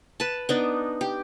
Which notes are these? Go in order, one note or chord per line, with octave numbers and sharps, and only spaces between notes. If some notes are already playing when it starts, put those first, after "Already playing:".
B4 A5
B3 D4 D#4
G4